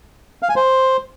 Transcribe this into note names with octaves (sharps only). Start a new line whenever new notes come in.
F5
G#5
C5